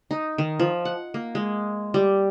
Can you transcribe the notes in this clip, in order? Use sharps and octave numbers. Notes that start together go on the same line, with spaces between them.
D#4
D#3
F3
F#5
A#3
G#3
G3